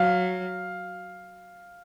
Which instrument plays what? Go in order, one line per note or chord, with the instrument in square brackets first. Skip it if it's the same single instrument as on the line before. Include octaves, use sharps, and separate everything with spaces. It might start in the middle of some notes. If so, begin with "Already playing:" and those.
Already playing: [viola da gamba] F#3 [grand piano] F5